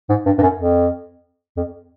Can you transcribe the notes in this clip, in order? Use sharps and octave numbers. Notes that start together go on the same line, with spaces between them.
G#2
G2
G2
F#2
F2
F2